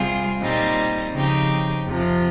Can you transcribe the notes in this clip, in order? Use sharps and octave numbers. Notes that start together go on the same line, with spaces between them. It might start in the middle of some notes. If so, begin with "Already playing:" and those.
Already playing: C3 G3 C4 F4 G#4
A#2 G3 C4 D#4
C#3 F3 C4 D#4 G4
F2 C3 F3